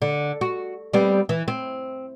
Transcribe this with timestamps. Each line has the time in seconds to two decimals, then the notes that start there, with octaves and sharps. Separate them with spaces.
0.02 D3
0.41 F#4
0.93 G3 B3 C4
1.29 E3
1.48 C4